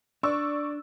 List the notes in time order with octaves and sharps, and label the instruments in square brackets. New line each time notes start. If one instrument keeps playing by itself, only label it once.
[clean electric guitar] D4 [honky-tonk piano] D5 C#6 E6